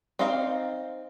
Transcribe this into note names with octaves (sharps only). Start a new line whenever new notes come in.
C4 D#4 C5 D5 F5